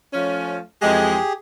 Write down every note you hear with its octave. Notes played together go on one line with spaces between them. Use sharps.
F3 A3 C#4
F2 E3 G#3 G4 G#4